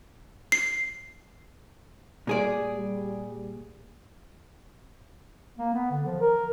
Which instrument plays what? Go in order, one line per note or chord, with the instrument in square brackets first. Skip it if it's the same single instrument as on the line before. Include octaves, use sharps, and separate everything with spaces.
[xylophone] C7
[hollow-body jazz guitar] A#2 G#4 D5 [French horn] G3
[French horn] G3
[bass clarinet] A#3
B3
D3
F3
A#4